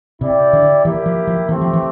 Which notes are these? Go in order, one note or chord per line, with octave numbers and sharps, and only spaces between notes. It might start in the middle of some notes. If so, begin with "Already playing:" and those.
C3 E4 G4 D5 G5
D3
E3 A#3 E4 G4
F3
F3
E3 A3 C4 G4
F3
E3